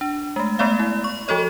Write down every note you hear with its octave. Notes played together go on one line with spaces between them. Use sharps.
D4
G#3 A3
G#3 A3 B3 D5 F5
E4
C#6
F3 F#4 A4 C#5 D#5